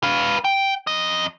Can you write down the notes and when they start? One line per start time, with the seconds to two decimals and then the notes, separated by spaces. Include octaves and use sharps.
0.03 B4 F5
0.44 G5
0.87 F2 D#5